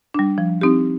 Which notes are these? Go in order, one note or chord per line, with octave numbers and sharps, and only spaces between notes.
G3 D4
F3
C4 D#4 G4